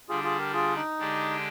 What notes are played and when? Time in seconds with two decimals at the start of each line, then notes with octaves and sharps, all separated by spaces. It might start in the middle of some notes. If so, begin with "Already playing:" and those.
0.09 D3 G3 D4 F4 G#4
0.23 F4 G#4
0.38 G4 A#4
0.53 F4 G#4
0.76 D#4
0.98 D3 G#3 D4 G4